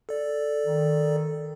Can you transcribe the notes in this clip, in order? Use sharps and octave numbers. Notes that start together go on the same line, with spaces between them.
A4 D5
D#3